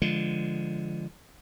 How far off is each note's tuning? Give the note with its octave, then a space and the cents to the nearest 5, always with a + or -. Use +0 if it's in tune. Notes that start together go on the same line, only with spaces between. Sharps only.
D3 +0 F3 -20 G#3 +0